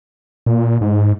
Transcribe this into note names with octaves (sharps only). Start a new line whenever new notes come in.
A#2
G#2